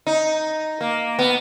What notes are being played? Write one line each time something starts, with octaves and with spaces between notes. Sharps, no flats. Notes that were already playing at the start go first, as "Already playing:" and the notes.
D#4
A#3
B3